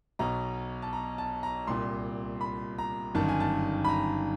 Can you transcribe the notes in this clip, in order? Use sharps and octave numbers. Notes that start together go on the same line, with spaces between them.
B1 B2 A#5
A5
A#5
A5
A#5
C2 A#2 C6
B5
A#5
G1 F#2 D#3 A5
G#5
A5
B5
A#5